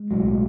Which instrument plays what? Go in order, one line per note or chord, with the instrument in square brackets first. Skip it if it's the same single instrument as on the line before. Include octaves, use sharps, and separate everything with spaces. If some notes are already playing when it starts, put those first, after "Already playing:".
Already playing: [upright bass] G#3
[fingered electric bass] B1 A2 F#3